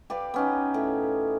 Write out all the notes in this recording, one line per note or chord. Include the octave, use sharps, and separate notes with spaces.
G4 B4 D5 F5
B3 C#4 D#4
A2